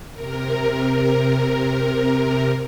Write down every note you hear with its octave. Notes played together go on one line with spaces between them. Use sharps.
C3 A#4